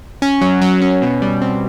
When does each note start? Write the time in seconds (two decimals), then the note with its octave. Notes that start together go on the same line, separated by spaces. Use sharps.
0.22 C#4
0.41 F#3
0.62 F#3
0.82 C#4
1.02 B2
1.22 G3
1.41 C4